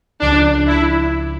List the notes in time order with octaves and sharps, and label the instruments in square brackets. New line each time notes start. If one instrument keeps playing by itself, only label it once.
[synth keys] C#2 C#3 F3 [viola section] D4
[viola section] E4